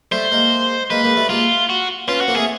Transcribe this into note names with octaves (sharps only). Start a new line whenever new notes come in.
G3 A3 C5
G#3 A#3
G#3 A#3 B4
G#3 A#3
G3 A3
G#3 A#3 F4
F#4
B3 C#4 F4
F#4
A#3 C4
A3 G#4